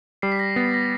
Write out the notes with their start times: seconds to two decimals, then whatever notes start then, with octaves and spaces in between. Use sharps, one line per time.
0.22 G3 C7
0.32 B6
0.39 A#6
0.56 B3 A6
0.74 A#6